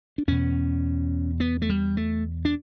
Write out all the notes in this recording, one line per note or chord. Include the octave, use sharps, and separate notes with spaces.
D4
E2 B2 C#4
B3
A3
G3
A3
D4